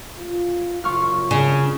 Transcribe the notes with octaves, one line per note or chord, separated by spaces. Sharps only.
F4
F#1 F#2 F4 C#6 F6
C#3